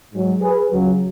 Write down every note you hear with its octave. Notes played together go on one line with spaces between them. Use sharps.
G#2 F#3
G#4 B4
C#2 C#3 F#3